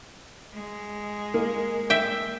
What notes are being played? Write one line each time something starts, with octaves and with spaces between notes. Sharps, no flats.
G#3
A#3
E5 G5